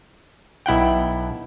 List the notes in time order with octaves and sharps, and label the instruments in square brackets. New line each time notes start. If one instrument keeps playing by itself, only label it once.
[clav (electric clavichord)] B1 E4 F#5 G5